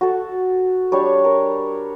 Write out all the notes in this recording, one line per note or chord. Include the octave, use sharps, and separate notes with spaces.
F#4 A4
G3 D4 C#5
A#4